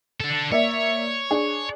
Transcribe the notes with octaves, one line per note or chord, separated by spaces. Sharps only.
D4 A4
A#3 C#5 D5 E5
D4 G#4